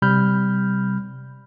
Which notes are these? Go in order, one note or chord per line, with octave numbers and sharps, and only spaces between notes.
C3 G3 B5 F6 G6